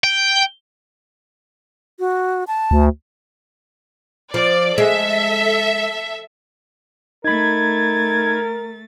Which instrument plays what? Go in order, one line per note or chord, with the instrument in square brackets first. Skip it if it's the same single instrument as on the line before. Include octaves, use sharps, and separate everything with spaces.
[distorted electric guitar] G5
[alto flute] F#4
A5
[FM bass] D2
[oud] F3 [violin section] D5
[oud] G#3 [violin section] A4 E5
[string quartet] A3 A6 [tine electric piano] D#4 B5 [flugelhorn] A#4 [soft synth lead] G#6